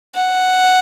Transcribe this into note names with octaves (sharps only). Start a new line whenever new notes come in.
F#5